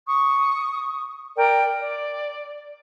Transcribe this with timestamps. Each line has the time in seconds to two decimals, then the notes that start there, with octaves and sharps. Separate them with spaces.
0.05 C#6 D#6
1.37 A#4 D5 G5
1.80 D5